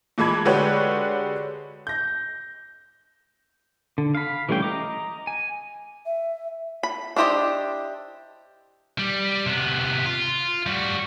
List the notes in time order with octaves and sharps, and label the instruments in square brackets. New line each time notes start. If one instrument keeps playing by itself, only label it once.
[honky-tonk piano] A#2 E3 G#3 A5 B5 G#6
D3 G#3 F#4 G4 B4 C#5
G6 A#6
[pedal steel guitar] D3
F5 B5
E3 G3 A3 C#4 G5
D#5 A#5 D6
G#5
[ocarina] E5
[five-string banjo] B5
D4 E4 G4 C5 D#5
[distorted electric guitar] G3
C3 B3
F4
G3 F#4